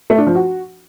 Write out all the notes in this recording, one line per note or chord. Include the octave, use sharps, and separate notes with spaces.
A3
D4
F3
F#4